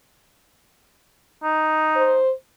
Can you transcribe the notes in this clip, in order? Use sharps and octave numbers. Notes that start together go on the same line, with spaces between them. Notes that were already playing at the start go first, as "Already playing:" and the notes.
D#4
C5